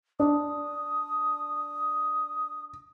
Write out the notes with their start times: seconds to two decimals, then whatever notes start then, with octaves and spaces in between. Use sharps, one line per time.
0.20 D4 D#6